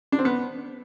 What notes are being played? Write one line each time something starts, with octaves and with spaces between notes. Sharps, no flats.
D4
C4
B3